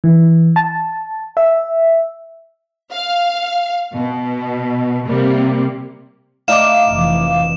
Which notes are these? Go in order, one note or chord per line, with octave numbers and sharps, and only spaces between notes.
E3
A5
E5
F5
B2
C3 G3 A#3
A3 D4 D#4 F5 D6 E7
F1 E3